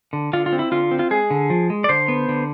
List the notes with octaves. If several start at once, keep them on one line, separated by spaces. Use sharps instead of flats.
D3
D3 F4
F4
C4
E4
D3 F4
C4
F4
G#3 G#4
D3
F3
G#3
D5
D3 C5
B3
D3